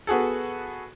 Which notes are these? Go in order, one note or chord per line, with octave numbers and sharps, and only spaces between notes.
B3 F#4 G#4 A4